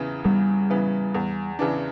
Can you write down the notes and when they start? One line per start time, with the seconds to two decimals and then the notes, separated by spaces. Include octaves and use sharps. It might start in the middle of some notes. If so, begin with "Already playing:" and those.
Already playing: E2 C#3 E3 B3
0.24 E2 G3
0.70 C#3 E3 B3
1.14 E2
1.59 C#3 E3 B3 D4